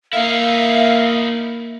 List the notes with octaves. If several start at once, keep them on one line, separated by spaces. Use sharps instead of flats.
A#3 D#4 E4 E5 F5